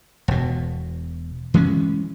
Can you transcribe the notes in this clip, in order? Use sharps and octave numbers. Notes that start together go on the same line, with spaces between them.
E1 B2
E3 G#3 A3 C#4